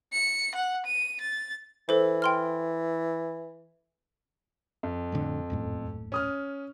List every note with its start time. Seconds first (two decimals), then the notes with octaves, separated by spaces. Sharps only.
0.13 C#7
0.55 F#5
0.86 D#7
1.21 A6
1.89 E3 A4 C5
2.22 G5 C6 F6
4.83 F2
5.12 G1 A2 D3
5.50 D#1 F#2 A2
6.12 C#4 D#6 F6